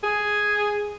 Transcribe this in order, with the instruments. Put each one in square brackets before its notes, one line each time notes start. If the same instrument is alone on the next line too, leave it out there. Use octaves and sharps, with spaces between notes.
[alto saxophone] G#4